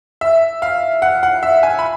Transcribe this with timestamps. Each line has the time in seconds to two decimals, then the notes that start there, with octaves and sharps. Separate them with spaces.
0.21 E5
0.62 F5
1.02 F#5
1.23 F#5
1.43 E5
1.63 G#5
1.79 B5